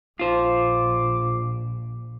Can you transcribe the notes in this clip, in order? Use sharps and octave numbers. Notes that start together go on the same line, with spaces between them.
A#1 F4 C5 D6